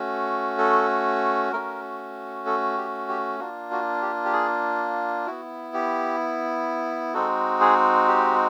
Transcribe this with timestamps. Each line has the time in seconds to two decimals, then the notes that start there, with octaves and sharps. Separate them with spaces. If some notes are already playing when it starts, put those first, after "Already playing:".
Already playing: A3 C#4 F#4
0.58 A4
1.53 A3 C#4 F#4 A#4
2.46 A4
2.77 G4
3.09 G4
3.39 A#3 D4 F4 F#4
3.71 F#4
4.02 G4
4.25 G4
4.33 G#4
5.27 B3 E4 F#4
5.74 G4
7.14 G#3 C4 D#4 F#4 A4
7.61 G#4
8.07 G4